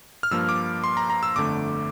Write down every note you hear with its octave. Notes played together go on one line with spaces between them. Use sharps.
F6
G2 F3 A#3 E6
D6
C6
A#5
A#5
E6
G1 F2 D3 A3 D6